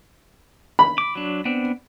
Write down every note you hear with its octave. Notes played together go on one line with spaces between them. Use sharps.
B5
D6
F#3 D4
B3 C4 D4